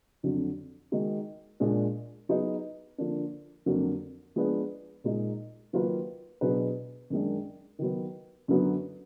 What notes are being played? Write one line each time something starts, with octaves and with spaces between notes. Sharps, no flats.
F2 D3 F#3
D#3 G#3 D#4 F#4
A#2 G#3 D4
F#3 B3 D#4 G#4
D3 F3 A#3 D4
F2 D3 F#3 A#3
F3 G#3 B3 D4 G#4
A#2 G#3 D#4
D#3 F#3 A#3 F4 B4
B2 F#3 D4 G#4 B4
F#2 D#3 G#3 D4
D#3 F#3 B3
F#2 D3 F#3 B3